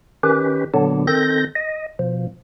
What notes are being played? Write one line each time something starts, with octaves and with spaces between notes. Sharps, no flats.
D#3 C#4 G4 B4
A#2 D3 F#3 B3 D4
D#3 C4 A4 G6 A#6
D#5
B2 F3